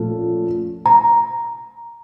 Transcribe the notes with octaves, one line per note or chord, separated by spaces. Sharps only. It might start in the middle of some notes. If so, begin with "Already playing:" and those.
Already playing: A#2 F3 A3 C#4 F4
A#5